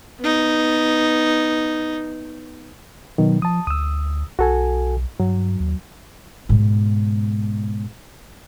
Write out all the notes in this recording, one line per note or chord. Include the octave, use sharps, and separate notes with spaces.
B3 D#4
B2 D#3 F#3
F3 A5 D#6
D2 D#6 E6
B1 F#4 A4 G#5
G2 F#3
D#2
G#2 B2